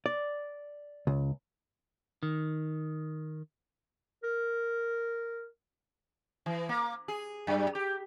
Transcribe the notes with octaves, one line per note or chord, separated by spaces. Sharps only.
D5
C#2
D#3
A#4
E3
A#3
G#4
F#2
G4